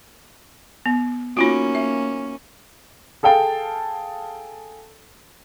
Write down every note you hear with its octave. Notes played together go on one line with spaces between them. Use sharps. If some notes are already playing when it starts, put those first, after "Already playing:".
B3
A#3 C#4 D#4 F4 F#4
E5
G#4 A4 F5 G5 A5